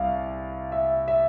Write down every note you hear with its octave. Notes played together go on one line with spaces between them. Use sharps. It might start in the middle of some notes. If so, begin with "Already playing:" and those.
Already playing: C2 F5
E5
E5